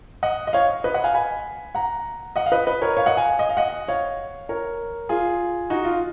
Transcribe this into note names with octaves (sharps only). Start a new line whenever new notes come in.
D#5 F#5
D#5
C#5 F5
B4 D#5
D#5 F#5
F5 G#5
G#5 B5
F#5 A#5
D#5 F#5
F5
B4 D#5
B4 D#5
A#4 C#5
C#5 F5
D#5 F#5
F5 G#5
D#5
F5
D#5 F#5
C#5 F5
A#4 C#5
F4 G#4
D#4 F#4
F4